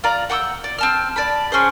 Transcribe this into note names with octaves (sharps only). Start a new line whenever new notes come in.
F4 D5 A#5
F#5 G5 C#6 E6
D5
C4 A5 F6
D5 A5 B5
C4 C#4 G#4 C5